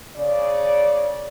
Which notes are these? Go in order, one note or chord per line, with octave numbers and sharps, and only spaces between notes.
C#3 D5